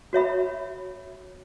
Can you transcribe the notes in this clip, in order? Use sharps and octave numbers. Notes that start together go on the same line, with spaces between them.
F#4 C#5 E5 B5